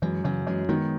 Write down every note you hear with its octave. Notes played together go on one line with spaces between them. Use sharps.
F#2 E3 G#3
F#2 C#3 E3
F#2 E3 G#3
D#3 G#3 B3